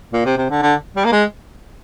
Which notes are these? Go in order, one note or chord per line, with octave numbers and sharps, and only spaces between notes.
A#2
C3
C3
D3
D3
G3
A#3
G#3